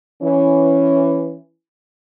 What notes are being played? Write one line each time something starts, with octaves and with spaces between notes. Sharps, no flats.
E3 C#4